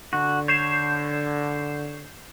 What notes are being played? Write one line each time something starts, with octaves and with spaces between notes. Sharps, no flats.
D3 F#4
C#5 G6 C7 E7